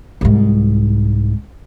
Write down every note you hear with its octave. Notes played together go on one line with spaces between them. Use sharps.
C2 G#2